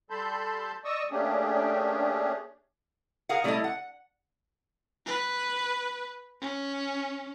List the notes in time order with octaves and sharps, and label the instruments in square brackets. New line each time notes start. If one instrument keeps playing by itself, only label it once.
[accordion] G3 A4 A5 B5 C6 G6
D5 D#5 C#6 D#6 E6
A3 A#3 C#4 D4 G4 G#4
[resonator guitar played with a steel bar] G#4 A#4 F5 F#5
G3 A3 B3 E4 A4 D#5
F#5
[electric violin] B4
C#4